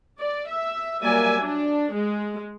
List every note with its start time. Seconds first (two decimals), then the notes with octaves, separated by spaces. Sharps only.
0.19 D5
0.49 E5
1.01 F#3 G3 A#3 D5 E5 G#5
1.40 D4
1.93 G#3